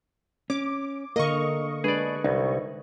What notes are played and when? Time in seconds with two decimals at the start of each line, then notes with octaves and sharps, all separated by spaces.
0.50 C#4 D6
1.16 D3 A#3 A#4 D#5 C#6
1.84 G#3 D4 G#4 B4 D5
2.24 C2 D#4